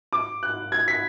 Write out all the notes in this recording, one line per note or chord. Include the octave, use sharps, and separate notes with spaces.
D6
F#6
G#6
B6